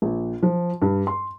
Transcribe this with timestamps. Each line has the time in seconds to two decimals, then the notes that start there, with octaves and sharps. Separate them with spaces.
0.02 A#1
0.43 F3
0.82 G2
1.07 C6